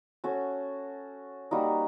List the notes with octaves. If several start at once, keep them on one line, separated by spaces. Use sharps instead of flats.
C#4 F#4 A4
G3 A#3 D#4 F#4